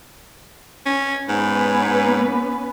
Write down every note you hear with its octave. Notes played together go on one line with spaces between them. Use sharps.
C#4
G#2 B3 C#4 B4